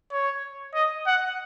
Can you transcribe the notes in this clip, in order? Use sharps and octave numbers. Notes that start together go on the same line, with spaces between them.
C#5
D#5
F#5